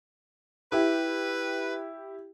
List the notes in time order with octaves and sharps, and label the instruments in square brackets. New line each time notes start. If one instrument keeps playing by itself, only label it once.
[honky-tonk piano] E4 G4 [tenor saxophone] B4